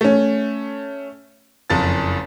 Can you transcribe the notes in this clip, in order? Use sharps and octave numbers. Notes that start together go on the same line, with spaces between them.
A3 C#4
F#1 F2 A6